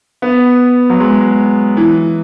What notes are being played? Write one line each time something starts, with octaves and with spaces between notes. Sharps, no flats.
B3
F#3
G#3
E3